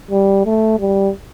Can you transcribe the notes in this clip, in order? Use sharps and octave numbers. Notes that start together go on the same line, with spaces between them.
G3
A3
G3